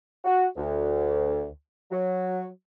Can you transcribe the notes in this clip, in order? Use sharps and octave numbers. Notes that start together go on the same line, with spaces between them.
F#4
D2
F#3